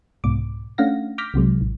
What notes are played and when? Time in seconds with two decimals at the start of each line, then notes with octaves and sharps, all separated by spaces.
0.24 C2 G#2 B2 D6
0.78 A3 C#4 D4 F5 F#5 A#6
1.18 D6 F6 G6 A#6 B6
1.34 C2 C3 F#3 G#3
1.61 A1